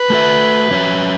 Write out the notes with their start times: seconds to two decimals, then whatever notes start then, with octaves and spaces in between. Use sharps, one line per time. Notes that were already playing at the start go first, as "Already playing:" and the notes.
Already playing: B4
0.10 A3 F#4 A4 E5
0.71 F#3 C#4 F#4 C#5 E5